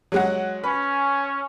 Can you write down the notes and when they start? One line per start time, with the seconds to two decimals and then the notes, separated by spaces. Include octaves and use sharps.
0.12 F#3 G#3 F#5
0.64 C#4 B4